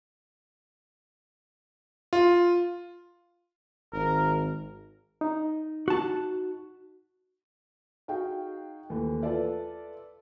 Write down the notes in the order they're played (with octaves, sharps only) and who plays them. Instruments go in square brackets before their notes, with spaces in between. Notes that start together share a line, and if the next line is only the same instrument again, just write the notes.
[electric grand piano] F4
[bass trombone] G#1 [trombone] A#4
[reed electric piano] D#4
[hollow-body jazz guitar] F#4 A5
[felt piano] D#4 F#4 G#4 F5 G5
D#2 A#2 E3 A3
F4 A4 B4 D5 E5